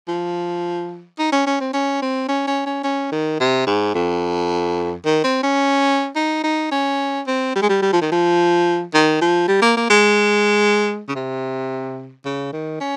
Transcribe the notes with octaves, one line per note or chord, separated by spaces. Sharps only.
F3
D#4
C#4
C#4
C4
C#4
C4
C#4
C#4
C#4
C#4
D#3
C3
G#2
F2
D#3
C4
C#4
D#4
D#4
C#4
C4
G3
G#3
G3
G3
F3
D#3
F3
D#3
F3
G3
A#3
A#3
G#3
C#3
C3
C#3
D#3
C#4